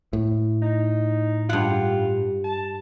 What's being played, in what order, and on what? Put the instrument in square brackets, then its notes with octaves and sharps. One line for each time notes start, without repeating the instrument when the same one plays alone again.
[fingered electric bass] A2
[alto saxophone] D#4
[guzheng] G2 F#5 [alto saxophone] F4
[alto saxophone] A5